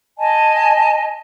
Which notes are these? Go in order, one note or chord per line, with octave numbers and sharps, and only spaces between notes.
D#5 G#5 A5